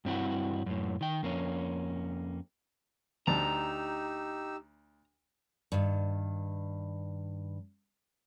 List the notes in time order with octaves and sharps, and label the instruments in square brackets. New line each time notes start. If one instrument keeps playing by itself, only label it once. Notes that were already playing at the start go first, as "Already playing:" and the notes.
[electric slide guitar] G2 C4 E4 F#4
F#2 A2
D#3 G5
F2 A#3 C#4
[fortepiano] D2 A5 [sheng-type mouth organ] D#4 G4 E6 [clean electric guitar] A#5
[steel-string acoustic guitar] G2 D#3